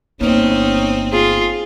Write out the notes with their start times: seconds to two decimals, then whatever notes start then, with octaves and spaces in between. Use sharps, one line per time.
0.21 G1 A#3 C4 C#4 D#4
1.12 F4 G#4